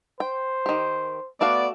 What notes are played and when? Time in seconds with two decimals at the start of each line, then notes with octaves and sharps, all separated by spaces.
0.20 C5 G5
0.66 D#3 G4
1.41 A3 B3 F#4 D5 F5